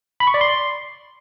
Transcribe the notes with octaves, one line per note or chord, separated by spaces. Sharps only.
B5
C#6
D5
C6